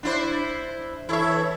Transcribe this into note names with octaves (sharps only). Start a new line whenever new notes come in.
D4 E4 C5
E3 E4 A4 C#5 E5